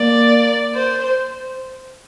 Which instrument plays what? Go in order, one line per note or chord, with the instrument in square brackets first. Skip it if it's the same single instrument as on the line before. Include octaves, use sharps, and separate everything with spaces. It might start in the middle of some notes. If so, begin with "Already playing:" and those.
Already playing: [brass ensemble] A#3 [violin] D5
[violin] C5